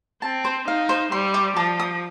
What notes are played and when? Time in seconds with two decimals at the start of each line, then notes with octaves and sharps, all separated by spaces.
0.22 C4 A5
0.45 C5
0.67 D#4 F5
0.89 C5
1.12 G3 C6
1.34 D5
1.56 F3 A5
1.80 D#6